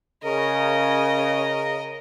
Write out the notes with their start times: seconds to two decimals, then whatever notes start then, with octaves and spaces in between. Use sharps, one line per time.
0.24 C#3 A#4 D#5